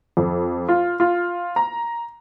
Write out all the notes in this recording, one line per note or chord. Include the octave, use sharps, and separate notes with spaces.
F2
F4
F4
A#5